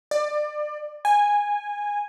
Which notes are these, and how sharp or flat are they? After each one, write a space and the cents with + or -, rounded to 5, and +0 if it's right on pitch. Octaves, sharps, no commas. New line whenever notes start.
D5 +25
G#5 -10